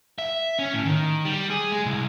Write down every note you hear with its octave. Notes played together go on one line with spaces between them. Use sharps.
E5
C#4
A2
D#3
G3
G#4
G#3
C2